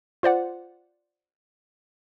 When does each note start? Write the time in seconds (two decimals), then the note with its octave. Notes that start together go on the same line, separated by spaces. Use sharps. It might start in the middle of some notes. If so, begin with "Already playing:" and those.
0.23 F4 C5 D5 F#5